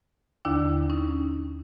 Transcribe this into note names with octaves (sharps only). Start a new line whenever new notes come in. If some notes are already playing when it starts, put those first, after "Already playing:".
D#2 D3 D4 E4
C#4 D#4